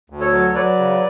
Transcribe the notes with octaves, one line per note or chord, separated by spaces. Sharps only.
D2
A4 C#5
F#3
F#3 B4 D5
C#3